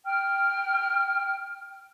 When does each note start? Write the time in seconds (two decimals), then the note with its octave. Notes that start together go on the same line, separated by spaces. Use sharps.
0.04 G5 F6